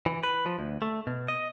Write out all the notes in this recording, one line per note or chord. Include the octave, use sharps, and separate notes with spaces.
E3
B4
F3
D2
A3
B2
D#5